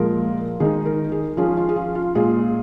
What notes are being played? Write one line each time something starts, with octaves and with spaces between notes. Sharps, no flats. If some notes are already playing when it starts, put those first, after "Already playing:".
Already playing: A#2 F3 G#3 F4 A#4
D#3 G#3 D#4 G#4
A#4
G#4
F3 C#4 F4 G#4
F4
G#4
F4
F4
A#2 G#3 F4 G#4